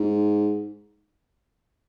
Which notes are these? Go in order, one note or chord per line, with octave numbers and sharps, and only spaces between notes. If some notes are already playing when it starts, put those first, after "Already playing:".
Already playing: G#2